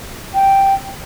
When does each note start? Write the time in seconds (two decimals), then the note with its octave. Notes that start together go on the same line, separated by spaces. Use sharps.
0.34 G5